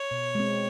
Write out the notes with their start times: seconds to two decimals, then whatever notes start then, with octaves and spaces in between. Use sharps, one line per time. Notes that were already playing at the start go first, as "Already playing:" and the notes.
Already playing: C#5
0.11 B2
0.35 G#3 C4